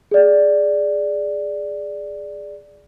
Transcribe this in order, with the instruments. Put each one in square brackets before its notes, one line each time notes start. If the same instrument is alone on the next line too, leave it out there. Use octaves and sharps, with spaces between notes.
[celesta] G#4 D5